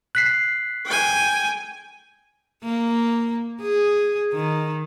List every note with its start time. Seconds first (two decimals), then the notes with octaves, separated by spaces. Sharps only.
0.15 F#6 B6 C7
0.86 G5 G#5
2.63 A#3
3.62 G#4
4.33 D#3